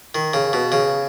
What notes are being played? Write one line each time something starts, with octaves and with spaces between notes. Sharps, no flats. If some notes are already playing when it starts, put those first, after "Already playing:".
D#3
C#3
B2
C#3